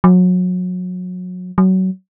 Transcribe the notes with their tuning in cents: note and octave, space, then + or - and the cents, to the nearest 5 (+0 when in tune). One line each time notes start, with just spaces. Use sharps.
F#3 -30
F#3 +20